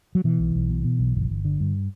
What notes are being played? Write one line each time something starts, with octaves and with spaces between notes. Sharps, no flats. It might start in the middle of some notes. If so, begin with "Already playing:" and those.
F#3
B2 E3
B1
B1
B2
B2
B1
G1
G1
D3
G2